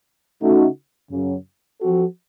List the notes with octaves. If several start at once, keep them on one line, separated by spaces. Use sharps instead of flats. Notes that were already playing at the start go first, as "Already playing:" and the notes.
C#3 A3 D#4 F#4
F#2 C#3 F#3
F3 C4 F#4 A4